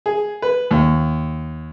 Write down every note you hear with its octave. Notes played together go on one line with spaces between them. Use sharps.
G#4
B4
D#2